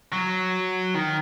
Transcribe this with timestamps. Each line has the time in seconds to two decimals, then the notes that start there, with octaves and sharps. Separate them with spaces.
0.13 F#3
0.95 D#3